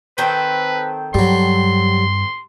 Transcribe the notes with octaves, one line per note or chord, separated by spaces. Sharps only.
D#3 C4 A4 B4
G2 F#3 G3 C6